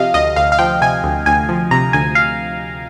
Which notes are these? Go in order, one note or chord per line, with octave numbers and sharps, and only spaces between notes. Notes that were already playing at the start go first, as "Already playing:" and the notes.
Already playing: C3 F3 D#5 F5
D2 D#5
D2 F5
F5
F3 G5
C3 G#5
D2
D2 G#5
F3
C3 A#5
D2 G#5
F5